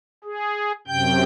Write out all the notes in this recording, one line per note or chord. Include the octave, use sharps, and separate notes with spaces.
G#4
F#2 C3 G5 G6